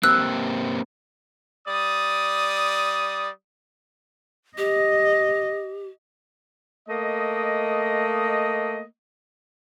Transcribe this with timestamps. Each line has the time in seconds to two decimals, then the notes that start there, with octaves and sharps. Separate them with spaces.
0.03 A#3 C4 G4 E6 F#6
1.68 G3 D5 D#6
4.58 G4 D#5
6.88 A3 A#3 D#5